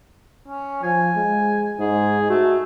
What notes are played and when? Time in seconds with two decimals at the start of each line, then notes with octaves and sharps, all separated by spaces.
0.48 C#4
0.83 F3 G#5
1.16 G#3
1.80 G#2 G#4
2.30 A3 F#4